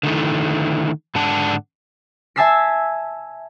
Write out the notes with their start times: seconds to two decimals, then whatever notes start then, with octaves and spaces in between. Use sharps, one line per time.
0.03 D3 D#3 A3 E4
1.15 G#2 D3 D4 F#5 A5
2.36 E5 G#5 A5 E6 B6 C7